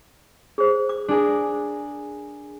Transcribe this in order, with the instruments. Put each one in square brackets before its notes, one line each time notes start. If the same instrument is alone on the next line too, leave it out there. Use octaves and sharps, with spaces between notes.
[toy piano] G#4 C5
D6
[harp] D4 G#4 A#4